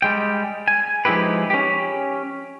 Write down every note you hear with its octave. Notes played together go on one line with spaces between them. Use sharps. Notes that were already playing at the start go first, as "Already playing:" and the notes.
G3 G#3 G5
G#5
F3 G#3 D#4 E4 G4 B4
C#4 G4